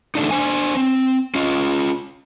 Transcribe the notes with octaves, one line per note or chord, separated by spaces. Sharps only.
D3 A3 D4 D#4
D4 C5 G#5
C4
C#4 F4